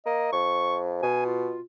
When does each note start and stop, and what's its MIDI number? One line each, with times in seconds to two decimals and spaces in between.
0.06 0.30 58
0.06 0.28 75
0.33 1.01 41
0.33 0.78 85
1.03 1.56 47
1.03 1.23 80
1.25 1.62 65